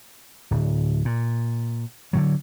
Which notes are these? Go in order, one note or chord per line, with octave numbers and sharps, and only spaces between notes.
D1
A#2
D3 D#3 F#3